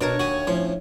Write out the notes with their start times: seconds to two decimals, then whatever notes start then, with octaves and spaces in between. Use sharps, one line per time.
0.01 B2 D4 A#4 C#5
0.20 D#2 F#4 G#5
0.47 A2 F3 C#4